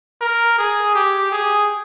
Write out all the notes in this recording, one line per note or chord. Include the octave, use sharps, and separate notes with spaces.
A#4
G#4
G4
G#4